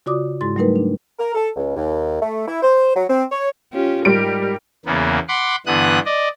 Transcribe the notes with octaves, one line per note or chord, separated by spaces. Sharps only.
C#3 F4 F#4 D5 D6 D#6
G#2 G#3 E4 F#4 C6 A6
F#3 G3 A3 D#4 A#4 B4
D4
A#4
A4
C#2
D#2
A3
E4
C5
F#3
C4
C#5
C#4 F4 G4
G#2 G3 A#4 D7
E2 C#3 A#3 B3
F#5 B5 C6 D6
G2 D3 E3 B3 D#6 F#6
D5 D#5